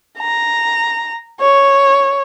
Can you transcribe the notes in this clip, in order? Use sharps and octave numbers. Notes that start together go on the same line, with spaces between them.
A#5
C#5